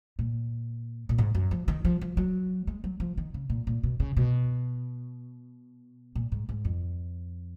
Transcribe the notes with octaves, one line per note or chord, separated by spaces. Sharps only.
A#2
A#2
G#2
F#2
F3
D#3
F3
F3
F#3
G#3
F#3
F3
D#3
C#3
A#2
A#2
B2
C#3
B2
A#2
G#2
G#2
F2